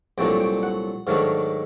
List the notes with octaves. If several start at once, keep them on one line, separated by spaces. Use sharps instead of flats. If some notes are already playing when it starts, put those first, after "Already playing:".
C2 A#2 F#3 A3 D4 G5
G5
F#5
G#2 D#3 F#3 A3 D4 F5